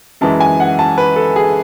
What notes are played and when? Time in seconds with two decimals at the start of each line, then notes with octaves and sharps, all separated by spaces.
0.21 F#2 E3 G#3 A5
0.40 G#5
0.60 F#5
0.79 A5
0.98 B4
1.16 A4
1.36 G#4